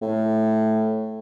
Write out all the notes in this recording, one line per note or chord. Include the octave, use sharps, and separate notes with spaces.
A2